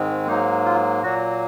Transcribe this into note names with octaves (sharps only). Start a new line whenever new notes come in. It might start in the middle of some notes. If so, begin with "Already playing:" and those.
Already playing: G#2 D#3 G#3 C4
G#2 F#3 A#3 D#4
F4
A#2 F#3 A#3 F#4